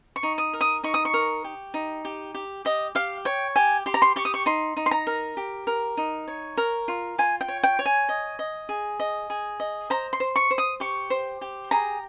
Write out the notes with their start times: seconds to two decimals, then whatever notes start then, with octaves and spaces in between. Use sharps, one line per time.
0.16 C#6
0.23 D#4
0.38 D#6
0.53 A#4
0.61 D#6
0.84 D#4 C#6
0.94 D#6
1.05 C#6
1.14 A#4
1.44 G4
1.74 D#4
2.05 G4
2.35 G4
2.65 G4 D#5
2.95 G4 F5
3.25 C#5 G5
3.56 G4 G#5
3.86 G4 C6
3.94 A#5
4.02 C6
4.16 G4 C#6
4.25 D#6
4.34 C#6
4.46 D#4 C6
4.77 D#4
4.86 C6
4.91 A#5
5.07 A#4
5.37 G4
5.67 A#4
5.97 D#4
6.28 C#5
6.58 A#4
6.88 F4
7.18 F4 G#5
7.41 G5
7.48 C#5
7.64 G5
7.79 C#5
7.86 G#5
8.09 D#5
8.39 D#5
8.69 G#4
9.00 D#5
9.30 G#4
9.60 D#5
9.90 C5 A#5
10.13 C6
10.20 C5
10.36 C#6
10.51 C5
10.58 D#6
10.80 G4 C#6
11.10 C5
11.41 G4
11.71 G#4 A#5